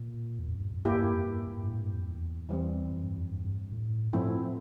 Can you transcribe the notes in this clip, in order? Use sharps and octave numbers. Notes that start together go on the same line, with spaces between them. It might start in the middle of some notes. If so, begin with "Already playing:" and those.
Already playing: A#2
E2
F2
G2
F2
G2 A#3 E4 G4
G2
F2
G2
G2
G2
A2
G2
F2
E2
E3 G3 C4
F2
G2
F2
G2
G2
A2
G2 F3 A3 C4 E4
A2